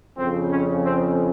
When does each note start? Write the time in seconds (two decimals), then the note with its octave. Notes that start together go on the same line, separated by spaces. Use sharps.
0.17 F2 C#3 C4
0.50 C#4
0.83 C4